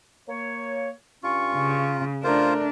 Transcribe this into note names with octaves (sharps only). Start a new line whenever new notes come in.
A#3 C#5
G2 C#4 F4 C#6
C#3
A3 D4 F4 A#4 C5